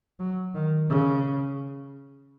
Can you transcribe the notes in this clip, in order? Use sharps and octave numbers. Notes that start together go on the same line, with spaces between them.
F#3
D#3
C#3